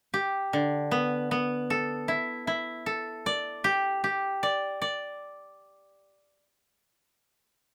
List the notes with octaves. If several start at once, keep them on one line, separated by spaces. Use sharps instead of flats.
G4
D3
B3
B3
A4
E4
E4
A4
D5
G4
G4
D5
D5